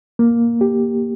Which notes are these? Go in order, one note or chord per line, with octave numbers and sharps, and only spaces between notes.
A#3
G4